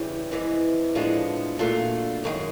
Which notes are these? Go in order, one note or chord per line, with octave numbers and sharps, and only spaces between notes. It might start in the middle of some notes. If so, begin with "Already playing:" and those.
Already playing: D2 C#3 E3 G3
E2 C3 E3 G#3
A2 F3 G#3 B3 D4
A#2 F#3 A3 D4 F4
F#2 D#3 G#3